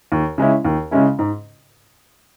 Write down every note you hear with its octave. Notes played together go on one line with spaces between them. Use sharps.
D#2
C#3 G#3 C#4 E4
D#2
C#3 G#3 C#4 E4
G#2